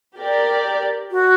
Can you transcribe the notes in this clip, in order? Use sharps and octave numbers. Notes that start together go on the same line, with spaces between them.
G4 A#4 D5
F#4